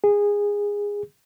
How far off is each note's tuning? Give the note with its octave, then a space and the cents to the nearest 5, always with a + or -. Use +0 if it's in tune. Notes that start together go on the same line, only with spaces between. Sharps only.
G#4 -20